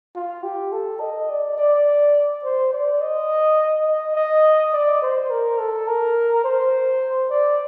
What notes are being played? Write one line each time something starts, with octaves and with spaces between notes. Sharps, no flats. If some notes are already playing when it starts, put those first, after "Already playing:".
F4
G4
A4
D#5
D5
D5
C5
D5
D#5
D#5
D#5
D5
C5
A#4
A4
A#4
C5
D5